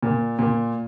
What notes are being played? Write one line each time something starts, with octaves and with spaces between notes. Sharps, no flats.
A#2
A#2